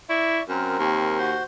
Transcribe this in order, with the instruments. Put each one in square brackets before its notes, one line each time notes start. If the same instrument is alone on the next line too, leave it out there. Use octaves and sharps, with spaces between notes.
[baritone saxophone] E4 [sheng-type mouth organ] D5 E5 C#6
[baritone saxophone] F#2 [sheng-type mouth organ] C4 A#4
[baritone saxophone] D#2
[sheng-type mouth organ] F#4 C5 C6